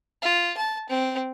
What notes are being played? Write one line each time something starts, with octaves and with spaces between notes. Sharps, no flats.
F4
A5
C4